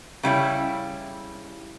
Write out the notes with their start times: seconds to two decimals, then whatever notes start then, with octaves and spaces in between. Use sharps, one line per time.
0.23 C#3 G3 E4 C#5